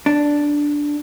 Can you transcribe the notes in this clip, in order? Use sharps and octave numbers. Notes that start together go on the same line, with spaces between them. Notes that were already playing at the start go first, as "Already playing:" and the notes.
D4